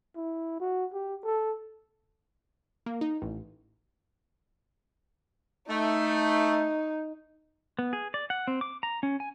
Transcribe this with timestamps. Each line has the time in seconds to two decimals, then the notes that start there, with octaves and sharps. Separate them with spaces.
0.16 E4
0.60 F#4
0.93 G4
1.24 A4
2.86 A#3
3.01 D#4
3.22 A1
5.69 A3 D#4
7.79 B3
7.93 G#4
8.14 D5
8.30 F#5
8.47 C4
8.61 D6
8.83 A#5
9.03 C#4
9.20 G#5